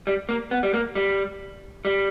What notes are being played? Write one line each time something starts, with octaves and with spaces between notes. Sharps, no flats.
G3
A#3
B3
G3
A#3
G3
G3